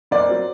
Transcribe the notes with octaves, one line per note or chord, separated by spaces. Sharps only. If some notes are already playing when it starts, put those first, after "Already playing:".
F#1 D5
F#3 C4